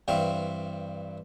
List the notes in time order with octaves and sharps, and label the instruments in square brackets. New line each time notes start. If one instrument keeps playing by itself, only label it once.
[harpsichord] G2 E3 C4 F5 C#6